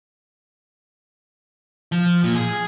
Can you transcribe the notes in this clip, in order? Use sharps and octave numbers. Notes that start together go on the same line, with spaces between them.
F3
A#2
G#4